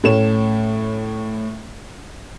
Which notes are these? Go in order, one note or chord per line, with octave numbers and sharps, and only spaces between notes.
A2 A3 C#4 E7